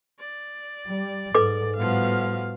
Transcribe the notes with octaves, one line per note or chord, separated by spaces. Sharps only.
D5
G3
G#2 A4 B4 D6
A2 F3 G3 B3 F#4 F5